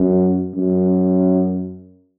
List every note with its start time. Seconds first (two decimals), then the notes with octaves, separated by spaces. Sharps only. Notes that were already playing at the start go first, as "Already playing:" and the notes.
Already playing: F#2
0.55 F#2